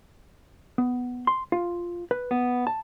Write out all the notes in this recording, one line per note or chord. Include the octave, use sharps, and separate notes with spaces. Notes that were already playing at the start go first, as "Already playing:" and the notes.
B3
C6
F4
B4
B3
A5